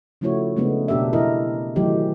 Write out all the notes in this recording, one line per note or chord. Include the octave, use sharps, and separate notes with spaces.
C#3 F3 A3 E4 F#4 C#5
C#3 G#3 A3 B3 D4
B2 D4 G4 A#4 E5
E3 E4 A#4 D#5
D#3 E3 F#3 A3 D#4 G4